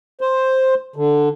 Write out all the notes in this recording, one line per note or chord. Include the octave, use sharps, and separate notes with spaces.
C5
D3